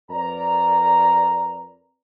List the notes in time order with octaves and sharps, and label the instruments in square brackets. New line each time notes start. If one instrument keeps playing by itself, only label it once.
[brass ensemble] F2 A#4 B4 D5 A#5